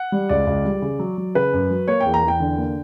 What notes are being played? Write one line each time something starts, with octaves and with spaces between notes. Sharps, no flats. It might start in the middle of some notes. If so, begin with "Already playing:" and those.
Already playing: F#5
G3
C#2 D5
C#2
G3
C#3
F#3
F#3
C#3 B4
F#2
F#3
A#3 C#5
E2 G5
A#5
E2 G5
D3
A#3